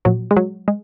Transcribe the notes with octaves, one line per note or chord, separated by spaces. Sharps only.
A#2 F3 F#3
G#3
F#3
G#3